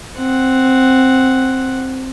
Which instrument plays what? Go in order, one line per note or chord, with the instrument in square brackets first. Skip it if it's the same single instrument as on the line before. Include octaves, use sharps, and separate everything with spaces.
[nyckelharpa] C4 F#5